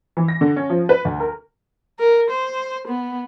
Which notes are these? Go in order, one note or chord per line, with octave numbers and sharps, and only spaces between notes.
E3
A#6
D3
C#4
F3
B4
D2
A#4
A#4
C5
B3